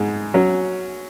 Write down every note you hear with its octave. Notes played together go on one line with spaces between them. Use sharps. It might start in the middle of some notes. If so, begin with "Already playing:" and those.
Already playing: G#2 G#3 D#4
F#3 C#4